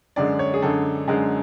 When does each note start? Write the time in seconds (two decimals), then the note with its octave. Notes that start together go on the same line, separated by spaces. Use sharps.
0.16 F#2 D3 G#3 D5
0.39 C#5
0.54 G#4
0.62 F#2 D3 G#3 A4
1.08 F#2 D3 G#3